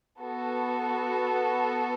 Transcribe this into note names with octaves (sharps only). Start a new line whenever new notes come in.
B3 F#4 A4